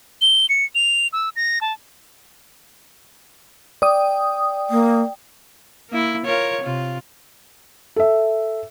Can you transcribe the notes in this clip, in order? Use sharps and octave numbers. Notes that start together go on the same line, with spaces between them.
G7
C#7
F7
E6
A#6
A5
D5 G5 D#6
A#3
A#3 E4
F4 A#4 C#5
C3 F4
A4 E5